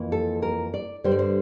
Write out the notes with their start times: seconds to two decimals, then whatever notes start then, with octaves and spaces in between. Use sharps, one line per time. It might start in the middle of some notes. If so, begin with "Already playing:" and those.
Already playing: F2 E3 A#3
0.12 A4
0.42 A#4
0.74 D5
1.04 G2 D3 G3 C5
1.12 D5
1.19 C5